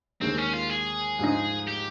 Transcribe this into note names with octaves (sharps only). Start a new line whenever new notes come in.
D#2 D#3 G#3 C4
C#4
F4
G#4
G#2 F3 G#3 D#4
G4